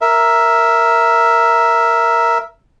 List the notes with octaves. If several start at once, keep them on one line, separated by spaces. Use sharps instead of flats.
A#4 E5